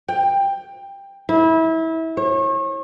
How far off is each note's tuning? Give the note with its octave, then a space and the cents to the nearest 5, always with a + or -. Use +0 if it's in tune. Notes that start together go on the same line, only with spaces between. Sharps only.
G5 +15
E4 -25
C#5 -35